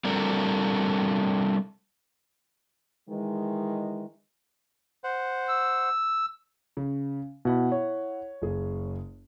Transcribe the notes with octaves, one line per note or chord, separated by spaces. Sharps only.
G3 C4 D4 A4 A#4
D#3 E3 G#3
C5 F#5
E6
C#3
B2 E4 F#5 B5
C#5
F#1 G#4